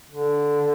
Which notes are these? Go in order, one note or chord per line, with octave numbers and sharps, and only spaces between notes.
D3